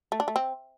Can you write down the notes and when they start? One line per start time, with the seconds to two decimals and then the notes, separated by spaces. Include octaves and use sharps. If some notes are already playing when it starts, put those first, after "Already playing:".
0.12 A3
0.20 D4
0.28 A3
0.36 C4